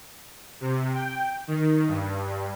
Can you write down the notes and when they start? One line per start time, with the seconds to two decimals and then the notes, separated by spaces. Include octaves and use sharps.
0.61 C3
0.94 G5
1.48 D#3
1.88 G2